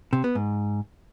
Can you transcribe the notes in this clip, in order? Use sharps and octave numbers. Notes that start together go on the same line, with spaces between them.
C3
B3
G#2